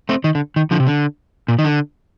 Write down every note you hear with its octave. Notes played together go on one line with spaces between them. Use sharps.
A3 C4
D#3
D3
D#3
D3 F3
C3
D3
A#2
D#3
D3